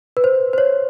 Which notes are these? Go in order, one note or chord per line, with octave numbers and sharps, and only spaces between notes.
B4
C5
C5
C#5